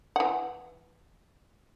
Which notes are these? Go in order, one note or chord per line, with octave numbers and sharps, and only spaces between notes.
E3 F#5